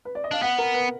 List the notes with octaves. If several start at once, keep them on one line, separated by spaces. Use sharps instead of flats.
B4
D5
D#5
D4 F5
B3 F#5
A#4
B4